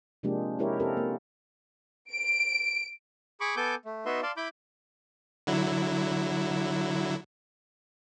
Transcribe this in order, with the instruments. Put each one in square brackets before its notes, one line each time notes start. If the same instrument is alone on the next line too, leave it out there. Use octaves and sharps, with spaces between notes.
[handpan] C3 F3 G#3 A#3 D4 G4
G#3 C#4 E4 G4 A#4 C#5
C4 F4 G4 A4 A#4
A#3
[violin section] D7
[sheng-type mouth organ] G#4 B5 C#6 D6
B3 A4 G#5 D6 G6
A3
B3 D#4 F#4 B4 E5 C6
D5 F5 A5 C6
E4 B5 D6 G6
[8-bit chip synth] D3 F#3 E4